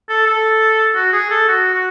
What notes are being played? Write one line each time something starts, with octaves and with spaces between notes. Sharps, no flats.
A4
A4
F#4
G#4
A4
F#4
F#4